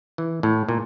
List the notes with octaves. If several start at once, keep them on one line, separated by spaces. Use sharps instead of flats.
E3
A2
A#2